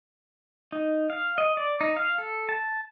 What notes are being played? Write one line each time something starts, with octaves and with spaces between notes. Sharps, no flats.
D#4
F5
D#5
D5
D#4
F5
A4
A5